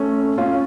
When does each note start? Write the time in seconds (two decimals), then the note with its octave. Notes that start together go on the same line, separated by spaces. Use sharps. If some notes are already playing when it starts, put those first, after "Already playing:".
Already playing: A3 C#4
0.38 C#4 F4